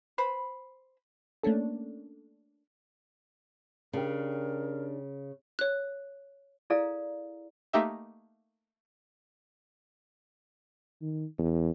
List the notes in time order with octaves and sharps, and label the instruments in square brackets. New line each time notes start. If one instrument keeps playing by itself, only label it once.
[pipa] B4 C5 B5
[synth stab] A3 A#3 C#4 D4 A4
[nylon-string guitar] C#3 [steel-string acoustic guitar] D4 G4 [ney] A#4
[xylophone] C#5 F#6
[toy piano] E4 G#4 A4 D5 F5 A#5
[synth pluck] A3 A#3 D#4 G4 E5
[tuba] D#3
E2